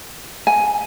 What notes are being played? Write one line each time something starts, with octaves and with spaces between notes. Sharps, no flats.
G#5